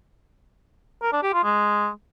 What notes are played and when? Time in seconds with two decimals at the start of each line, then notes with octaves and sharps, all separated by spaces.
1.02 A#4
1.13 D4
1.23 G4
1.33 F4
1.44 G#3